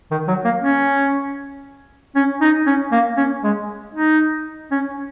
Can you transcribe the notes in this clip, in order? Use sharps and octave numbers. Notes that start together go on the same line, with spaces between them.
D#3
F#3
A#3
C#4
C#4
D#4
C#4
A#3
C#4
G#3
D#4
C#4